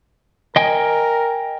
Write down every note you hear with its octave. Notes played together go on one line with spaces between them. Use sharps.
A#4 D#5 G5 G#5